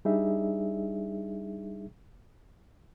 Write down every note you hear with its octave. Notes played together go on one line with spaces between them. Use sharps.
G3 D4 D#4 G#4 E5